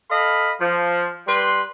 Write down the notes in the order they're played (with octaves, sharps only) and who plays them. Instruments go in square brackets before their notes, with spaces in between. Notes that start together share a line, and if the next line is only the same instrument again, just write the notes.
[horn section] A4 D#5 F5 B5
F3
G3 B4 C6